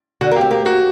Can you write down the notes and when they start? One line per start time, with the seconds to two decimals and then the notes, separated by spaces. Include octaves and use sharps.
0.21 D3 F#4
0.31 A#3
0.36 G4
0.41 C4
0.51 A#3 G4
0.65 A#3 F#4